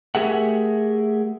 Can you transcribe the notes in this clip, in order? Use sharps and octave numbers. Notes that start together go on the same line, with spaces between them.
A3 G4 G#4 A#4 E5 F#5